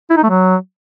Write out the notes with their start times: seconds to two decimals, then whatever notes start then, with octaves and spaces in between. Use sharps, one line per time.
0.10 E4
0.17 D#4
0.23 A3
0.29 F#3